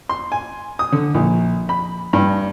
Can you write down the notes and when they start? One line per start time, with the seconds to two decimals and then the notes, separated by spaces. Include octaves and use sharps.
0.09 C6
0.32 G#5
0.79 D#6
0.92 D3
1.14 A#1
1.69 B5
2.13 G2